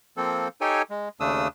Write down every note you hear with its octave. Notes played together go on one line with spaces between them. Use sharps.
F3 A#3 C4 A4
D#4 G4 A4 C#5 G5 G#5
G#3
D#2 C#3 A3 D4 D#6 E6